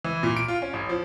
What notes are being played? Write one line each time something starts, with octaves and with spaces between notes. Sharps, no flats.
E3
A#2
D7
F4
C#4
A1
F3